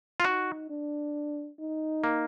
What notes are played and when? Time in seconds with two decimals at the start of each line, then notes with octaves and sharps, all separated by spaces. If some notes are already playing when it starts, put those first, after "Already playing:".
0.20 F4
0.24 D#4 F#4
0.69 D4
1.59 D#4
2.04 A#3